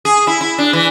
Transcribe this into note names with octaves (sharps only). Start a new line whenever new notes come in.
G#4
E4
E4
D4
E3